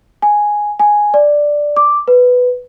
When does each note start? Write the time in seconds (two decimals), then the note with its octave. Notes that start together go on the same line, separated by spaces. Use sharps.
0.22 G#5
0.79 G#5
1.14 D5
1.77 D6
2.08 B4